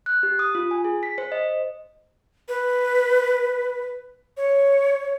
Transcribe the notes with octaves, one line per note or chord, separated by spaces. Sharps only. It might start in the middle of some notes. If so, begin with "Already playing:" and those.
F#6
G4
D#6
F4
G#5
G#4
B6
C5
D#5
B4
C#5